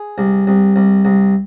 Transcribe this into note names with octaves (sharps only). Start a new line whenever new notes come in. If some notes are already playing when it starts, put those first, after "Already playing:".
Already playing: G#4
C2
C2
C2
C2